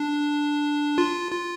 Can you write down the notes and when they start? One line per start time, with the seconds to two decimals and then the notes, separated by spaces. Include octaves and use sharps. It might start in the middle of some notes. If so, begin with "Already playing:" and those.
Already playing: D4
0.98 F4
1.31 F4